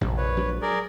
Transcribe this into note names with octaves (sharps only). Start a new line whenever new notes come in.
A#1 F2 C3
B4 C#5
F#3 G#3 D4
G#4 A#4 D5